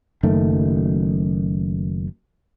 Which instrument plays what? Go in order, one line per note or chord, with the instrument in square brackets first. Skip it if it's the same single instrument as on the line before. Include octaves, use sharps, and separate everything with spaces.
[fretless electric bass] F#1 F#2 D#3 A3